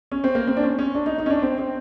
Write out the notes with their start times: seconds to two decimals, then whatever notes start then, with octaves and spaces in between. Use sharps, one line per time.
0.12 C#4
0.24 C4
0.35 A#3
0.47 C4
0.57 D4
0.63 C#4
0.79 C#4
0.95 D4
1.06 D#4
1.18 D#4
1.26 C#4
1.30 D4
1.42 C4
1.58 C4